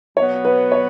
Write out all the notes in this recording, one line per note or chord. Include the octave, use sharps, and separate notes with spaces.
B2 F#3 B3 F#4 C#5
B4
C#5